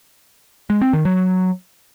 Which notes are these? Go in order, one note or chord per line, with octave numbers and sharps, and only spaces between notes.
G#3
C4
D#3
F#3